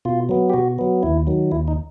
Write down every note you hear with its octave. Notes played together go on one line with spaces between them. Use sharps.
B2 F4
F#3 B3
G4
B2 F#4
F#3 B3
D#2 E4
D#3 F#3
D#2 E4
D#4